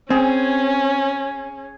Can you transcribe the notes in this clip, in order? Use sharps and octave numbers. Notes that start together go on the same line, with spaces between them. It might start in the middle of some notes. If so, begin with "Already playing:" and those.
C4 C#4 G#4